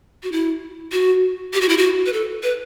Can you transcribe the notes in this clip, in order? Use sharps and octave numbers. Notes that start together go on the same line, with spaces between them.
F#4
E4
F#4
G4
F#4
E4
F#4
B4
A4
B4